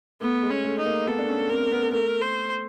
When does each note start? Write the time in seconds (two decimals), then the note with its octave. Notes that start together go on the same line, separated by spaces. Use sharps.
0.21 A3 B3
0.43 G#3
0.51 C#4
0.64 A3
0.79 D#4
0.86 A#3
1.07 B3 A4
1.18 D4
1.29 C#4
1.50 C4 A#4
1.72 B3
1.92 A3 A#4
2.21 C5